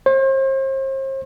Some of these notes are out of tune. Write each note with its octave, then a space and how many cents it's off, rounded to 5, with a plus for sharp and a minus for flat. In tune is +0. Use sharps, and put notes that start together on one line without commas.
C5 +40